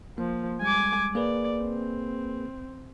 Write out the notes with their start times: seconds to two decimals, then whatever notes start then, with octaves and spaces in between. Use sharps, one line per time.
0.18 F3 A#3
0.62 G3 G#3 G#5 D6
1.15 A#3 G#4 B4 D5
1.60 C4